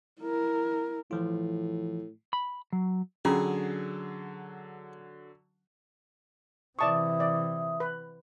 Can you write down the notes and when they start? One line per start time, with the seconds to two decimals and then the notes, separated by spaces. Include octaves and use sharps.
0.20 E4 A#4
1.11 A2 E3 F3 F4
2.33 B5
2.73 F#3
3.25 D3 F#3 C#4 F4 G#4 A#5
6.79 C3 E3 D5 E5 A5 C#6 D#6
7.20 D5
7.80 B4